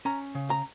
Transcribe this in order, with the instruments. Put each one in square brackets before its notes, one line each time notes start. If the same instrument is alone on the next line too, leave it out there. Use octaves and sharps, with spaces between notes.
[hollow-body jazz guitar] C#4 A#5
C#3
A#5